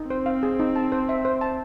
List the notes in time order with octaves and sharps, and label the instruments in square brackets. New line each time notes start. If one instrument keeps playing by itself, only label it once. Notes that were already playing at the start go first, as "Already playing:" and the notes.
Already playing: [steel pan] D#4
[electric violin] C4 [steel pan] C5
[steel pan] F5
G#4
D#4
A5
C5
E5
C5
A5